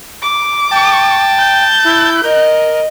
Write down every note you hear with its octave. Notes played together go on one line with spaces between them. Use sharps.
D6
G5 A5
G6
E4
A#4 D#5